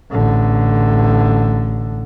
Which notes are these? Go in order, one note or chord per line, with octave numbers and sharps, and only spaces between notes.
A1 D3